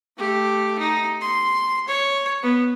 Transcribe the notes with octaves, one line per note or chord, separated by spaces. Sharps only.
A3 G4
D#4
C6
C#5
B3